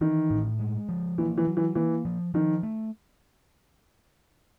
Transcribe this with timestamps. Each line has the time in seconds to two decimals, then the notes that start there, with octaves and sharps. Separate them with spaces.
0.01 D#3 E3
0.30 A2
0.59 G#3
0.89 F3
1.18 E3 A#3
1.38 E3
1.47 F#3
1.57 E3
1.75 E3 A#3
2.05 F3
2.34 D#3 F3
2.63 A3